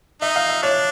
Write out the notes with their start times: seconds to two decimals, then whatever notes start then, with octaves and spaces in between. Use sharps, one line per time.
0.22 D#4 E5
0.36 F5
0.50 E5
0.63 D4 C#5